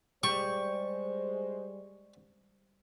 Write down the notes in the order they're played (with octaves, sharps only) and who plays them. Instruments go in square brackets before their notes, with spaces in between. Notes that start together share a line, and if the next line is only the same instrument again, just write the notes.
[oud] G3 [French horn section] G#3 C5 [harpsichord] C#6